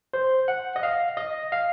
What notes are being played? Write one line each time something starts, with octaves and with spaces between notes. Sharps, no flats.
C5
F#5
D#5
F5
D#5
F5